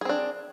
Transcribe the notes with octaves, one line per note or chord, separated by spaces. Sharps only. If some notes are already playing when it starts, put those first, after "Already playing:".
C4 D4 G#4